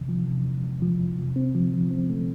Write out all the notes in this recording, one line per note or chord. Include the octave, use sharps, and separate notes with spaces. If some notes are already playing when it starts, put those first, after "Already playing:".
Already playing: E2 C3
F3
C3
E2
E2
F3
E2
C3
C4
F3
F3
C4
A3